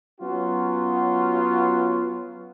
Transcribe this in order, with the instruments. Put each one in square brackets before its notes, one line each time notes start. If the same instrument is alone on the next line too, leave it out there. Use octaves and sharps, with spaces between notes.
[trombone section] F#3 B3 C#4 F4 F#4